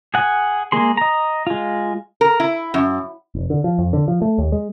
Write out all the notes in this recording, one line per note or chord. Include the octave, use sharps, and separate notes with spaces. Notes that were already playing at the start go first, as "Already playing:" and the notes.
G#4 F#5 G#5
G#3 A#3 G#4 C6
D#5 A#5
G#3 F4
A#4
E4
F#2
F1
D3
F3
F2
D3
F3
A3
D#2
G#3